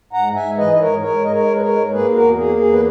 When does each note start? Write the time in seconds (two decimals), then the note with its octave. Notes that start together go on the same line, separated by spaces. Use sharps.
0.13 G#2 F#5 A#5
0.35 G#2 E5 G#5
0.57 E3 B4 D#5
0.73 D#5
0.79 G#2 A#4 C#5
1.02 G#2 A#4 C#5
1.24 G#3 D#5
1.32 A#4 C#5
1.47 G#3
1.55 B4
1.61 A#4 C#5
1.69 G#2
1.91 A#3 G#4 B4
2.14 E2 F#4 A#4
2.36 A#3 G#4
2.59 E2 G#4
2.73 B4